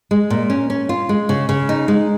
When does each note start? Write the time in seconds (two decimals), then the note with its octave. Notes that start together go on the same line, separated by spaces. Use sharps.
0.11 G#3
0.30 A#2
0.50 C#4
0.70 C#4
0.89 F4
1.09 G#3
1.29 C#3
1.49 C#3
1.69 D#4
1.88 G#3